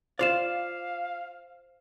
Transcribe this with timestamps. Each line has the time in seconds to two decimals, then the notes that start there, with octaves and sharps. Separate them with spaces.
0.19 F4 C5 D5 F5 E7